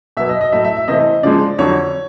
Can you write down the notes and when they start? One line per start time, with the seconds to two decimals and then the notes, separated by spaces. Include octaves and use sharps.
0.17 B2 F#3 B3 E5
0.29 D#5
0.41 D#5
0.52 A2 F#3 A3 E5
0.65 E5
0.77 E5
0.88 C3 E3 A3 C4 D#5
1.23 C#3 F3 G#3 D5
1.58 F2 D3 F#3 C#5